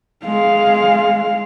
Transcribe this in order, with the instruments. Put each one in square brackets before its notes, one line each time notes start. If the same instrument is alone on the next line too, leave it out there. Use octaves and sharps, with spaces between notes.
[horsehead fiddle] G#3 F5